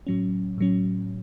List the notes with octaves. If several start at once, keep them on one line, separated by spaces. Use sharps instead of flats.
A2 F#3 C#4
A2 F#3 C#4